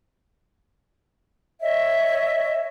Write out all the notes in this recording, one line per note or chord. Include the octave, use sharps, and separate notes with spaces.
C#5 D#5 E5